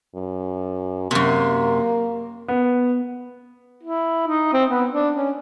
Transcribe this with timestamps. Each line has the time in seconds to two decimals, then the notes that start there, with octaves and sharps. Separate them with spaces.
0.15 F#2
1.11 F#2 C3 A#3
2.48 B3
3.84 E4
4.28 D#4
4.53 C4
4.70 B3
4.92 D4
5.16 C#4